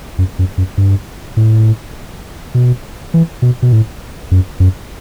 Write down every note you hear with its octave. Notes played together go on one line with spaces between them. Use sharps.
F#2
F#2
F#2
G2
A2
B2
E3
B2
B2
A2
F#2
F#2